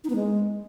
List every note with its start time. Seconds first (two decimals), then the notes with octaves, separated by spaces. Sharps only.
0.04 D#4
0.10 B3
0.15 G#3